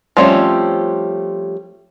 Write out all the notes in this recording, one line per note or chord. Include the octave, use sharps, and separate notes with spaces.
F3 G3 A3 C4 C#4